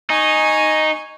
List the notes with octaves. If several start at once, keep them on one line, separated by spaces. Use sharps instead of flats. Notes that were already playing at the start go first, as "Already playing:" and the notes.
D#4 G#5 C#6